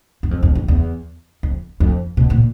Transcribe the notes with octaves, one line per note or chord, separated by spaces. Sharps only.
F#2
F2
F2
F2
E2
F2
F2
B2
A#2